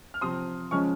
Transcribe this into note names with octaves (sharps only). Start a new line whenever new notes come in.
F6
C3 F3 C4 C6 D#6
C#3 F3 G#3 C#4 C#6 F6